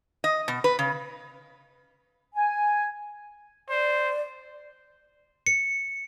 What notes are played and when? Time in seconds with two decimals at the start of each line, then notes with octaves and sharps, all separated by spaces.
0.24 D#5
0.48 B2
0.64 B4
0.79 C#3
2.36 G#5
3.69 C5 D5
5.47 C#7